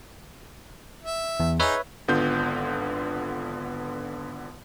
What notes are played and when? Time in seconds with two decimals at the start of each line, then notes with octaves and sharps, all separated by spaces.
1.04 E5
1.40 E2
1.60 D#4 G#4 B4 C#5 E5
2.08 G#1 D3 B3 F4 G6